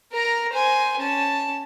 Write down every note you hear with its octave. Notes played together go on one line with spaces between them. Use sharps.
A#4 A#5
C5 G#5
C#4 A5